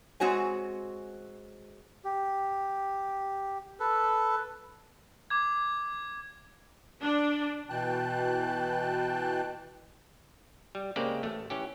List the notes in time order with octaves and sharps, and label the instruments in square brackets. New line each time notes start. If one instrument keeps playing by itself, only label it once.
[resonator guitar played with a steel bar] G#3 C4 F#4 C#5 G#5
[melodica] G4
A4 B4
[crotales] D6 G#6
[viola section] D4
[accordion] B2 E3 G5 A5 F#6
[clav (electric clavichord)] G3
C#3 G#3 A#3 C4 G4 D5
A1 A3
E3 C#4 G4